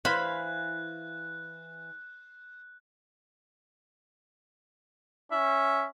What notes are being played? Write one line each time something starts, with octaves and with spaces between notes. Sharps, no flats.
E3 C5 F5 B5 F#6
C#4 E5